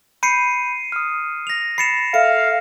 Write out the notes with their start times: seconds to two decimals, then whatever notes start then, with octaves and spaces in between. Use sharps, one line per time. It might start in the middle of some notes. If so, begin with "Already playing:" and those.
0.23 B5 G6 C7 C#7 D#7
0.92 D#6 F6
1.47 A#6 F7
1.78 B5 A6 C7 C#7 E7
2.14 A4 E5 F5 C#7